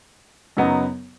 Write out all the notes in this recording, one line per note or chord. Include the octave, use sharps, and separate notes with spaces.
F#2 C#3 F#3 B3 D#4